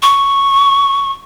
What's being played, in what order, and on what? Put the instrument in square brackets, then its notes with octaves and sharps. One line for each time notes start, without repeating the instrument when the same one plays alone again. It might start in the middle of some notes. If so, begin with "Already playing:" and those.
[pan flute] C#6